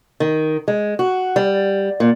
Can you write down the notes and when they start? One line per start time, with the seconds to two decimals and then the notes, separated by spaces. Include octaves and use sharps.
0.20 D#3
0.68 G#3
0.99 F#4
1.36 G3
2.00 A#2